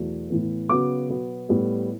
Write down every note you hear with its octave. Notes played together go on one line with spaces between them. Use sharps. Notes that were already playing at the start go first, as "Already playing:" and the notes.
Already playing: E2 B2 F#3 A3
A2 E3 B3
C#3 F#3 B3 D6
B2 F#3 B3
A2 G3 B3